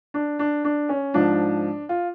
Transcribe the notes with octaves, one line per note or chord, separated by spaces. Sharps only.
D4
D4
D4
C#4
G#2 F3 D4
F4